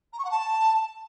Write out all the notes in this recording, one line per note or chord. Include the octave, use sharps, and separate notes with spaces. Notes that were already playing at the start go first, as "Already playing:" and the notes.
A#5
C#6
F#5
A5